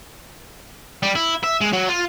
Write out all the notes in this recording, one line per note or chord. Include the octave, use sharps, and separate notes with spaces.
G3
E4
E5
G#3
F#3
F4